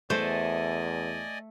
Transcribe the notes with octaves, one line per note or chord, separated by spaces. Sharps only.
E2 A3 C5 D5 D#5 G#5